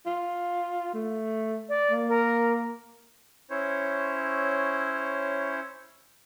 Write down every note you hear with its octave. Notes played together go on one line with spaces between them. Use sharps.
F4
A3
D5
A#3
A#4
C#4 E4 C5 C#5